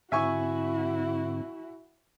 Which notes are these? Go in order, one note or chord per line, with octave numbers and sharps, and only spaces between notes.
G#2 D3 C4 E4 F#4 E5 G#5 C#6